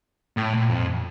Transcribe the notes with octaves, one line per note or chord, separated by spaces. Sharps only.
A2
A#2
F2